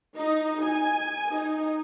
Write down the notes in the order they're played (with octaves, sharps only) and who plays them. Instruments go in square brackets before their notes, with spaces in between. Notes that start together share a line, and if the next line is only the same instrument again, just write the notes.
[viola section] D#4
G#5
D#4